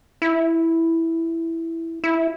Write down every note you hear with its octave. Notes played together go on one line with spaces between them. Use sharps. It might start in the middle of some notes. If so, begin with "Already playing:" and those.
E4
E4